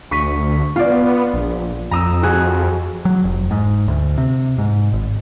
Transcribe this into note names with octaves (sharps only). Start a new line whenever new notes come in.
D2 C#6 B6 D#7
B3 F4 D5
A#1
F2 A#5 D#6 E6
F#4 G#4
F#3
F1
G#2
D2
C3
G#2
G#1